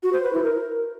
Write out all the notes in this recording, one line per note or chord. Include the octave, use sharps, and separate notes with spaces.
F#4
C5
B4
E4
A#4